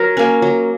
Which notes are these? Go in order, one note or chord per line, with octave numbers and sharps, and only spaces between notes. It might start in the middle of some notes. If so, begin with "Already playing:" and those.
Already playing: F#3 A#4
A#3 C#4
F#3